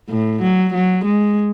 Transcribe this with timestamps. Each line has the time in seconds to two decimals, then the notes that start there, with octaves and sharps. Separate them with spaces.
0.10 A2
0.42 F#3
0.74 F#3
1.05 G#3